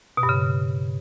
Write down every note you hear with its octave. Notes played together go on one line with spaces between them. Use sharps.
B2
G2
C#3